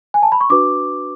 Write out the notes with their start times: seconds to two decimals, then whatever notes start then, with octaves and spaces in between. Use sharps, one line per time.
0.14 G#5
0.23 A5
0.32 B5
0.41 C#6
0.50 D4 F#4 B4 D6